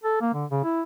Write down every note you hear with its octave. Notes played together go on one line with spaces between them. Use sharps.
A4
A#3
D3
C#3
E4